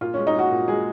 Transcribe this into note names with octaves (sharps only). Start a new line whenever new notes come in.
A#2 F4
G#3 C#4
D#4
G#3 F#4
A#2
G#3 G#4